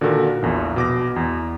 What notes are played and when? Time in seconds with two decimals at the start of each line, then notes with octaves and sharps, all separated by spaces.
0.01 A#2 D3 D#3 F#4 A4 A#4
0.42 A#1 E2 A#2
0.76 B2 D6 A#6
1.16 E2